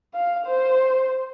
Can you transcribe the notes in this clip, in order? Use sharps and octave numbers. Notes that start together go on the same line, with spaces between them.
F5
C5